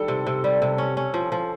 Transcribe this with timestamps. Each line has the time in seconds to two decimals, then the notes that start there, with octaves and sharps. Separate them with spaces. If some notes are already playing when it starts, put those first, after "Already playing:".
Already playing: D#3 G3 A4
0.08 C3
0.27 C3
0.44 G3
0.62 C3
0.78 C#4
0.97 C#4
1.14 F3
1.32 F3